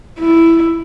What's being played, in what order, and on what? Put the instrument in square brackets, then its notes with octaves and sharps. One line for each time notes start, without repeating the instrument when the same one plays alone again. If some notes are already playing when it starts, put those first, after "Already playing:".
[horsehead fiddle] E4